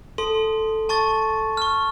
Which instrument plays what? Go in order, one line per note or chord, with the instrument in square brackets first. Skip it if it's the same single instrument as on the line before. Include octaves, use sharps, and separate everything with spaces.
[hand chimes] A4 [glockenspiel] C6
[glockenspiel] A5 C#6 A6
C#6 F6